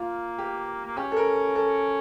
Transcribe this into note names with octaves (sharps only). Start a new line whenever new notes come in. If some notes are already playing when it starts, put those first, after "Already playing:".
Already playing: A#3 F4
G4
A#3
C#4 G4
A4
A#4
A4